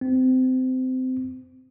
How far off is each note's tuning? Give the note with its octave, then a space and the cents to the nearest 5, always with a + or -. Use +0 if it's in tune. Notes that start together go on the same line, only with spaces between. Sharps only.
C4 -25